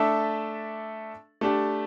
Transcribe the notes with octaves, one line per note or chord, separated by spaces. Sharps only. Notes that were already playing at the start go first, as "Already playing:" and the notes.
Already playing: A3 D4 A4 E5
A3 D4 G4